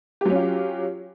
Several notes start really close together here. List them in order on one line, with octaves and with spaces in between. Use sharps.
G4 F#3 C#4 F4